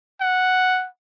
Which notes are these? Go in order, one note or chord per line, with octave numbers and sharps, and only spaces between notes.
F#5